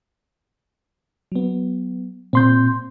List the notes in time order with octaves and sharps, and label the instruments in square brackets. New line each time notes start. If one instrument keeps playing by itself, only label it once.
[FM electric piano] F#3 B3
[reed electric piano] A#2 C6 G6 [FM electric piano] C4